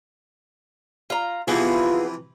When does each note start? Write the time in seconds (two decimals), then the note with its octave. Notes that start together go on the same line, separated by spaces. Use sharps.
1.10 F4 A#5
1.48 C3 E3 F3 B3 E4 F4 G#4